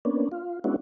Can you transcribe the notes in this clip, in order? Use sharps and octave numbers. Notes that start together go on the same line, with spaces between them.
A#3 B3 C#4 D4
F4
G#3 B3 C#4 D4 E4 F#4